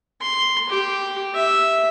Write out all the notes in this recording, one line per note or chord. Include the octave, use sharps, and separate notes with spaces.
C6
G4
E5